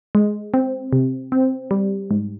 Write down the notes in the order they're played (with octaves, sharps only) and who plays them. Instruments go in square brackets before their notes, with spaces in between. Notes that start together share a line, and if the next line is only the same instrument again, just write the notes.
[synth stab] G#3
C4
C3
C4
G3
G#2